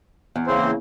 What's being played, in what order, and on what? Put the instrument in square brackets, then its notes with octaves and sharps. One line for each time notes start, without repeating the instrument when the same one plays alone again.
[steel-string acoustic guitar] E2
[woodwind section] C#3 E3 A#3 [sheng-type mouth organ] C4 C5